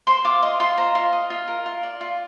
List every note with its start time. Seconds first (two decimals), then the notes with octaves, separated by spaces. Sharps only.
0.07 C5 C6
0.25 F4 D6
0.42 D#5 C6
0.60 F4 C6
0.77 C5 A#5
0.95 F4
1.13 D#5
1.30 F4
1.48 A#4
1.66 F4
1.83 D5
2.01 F4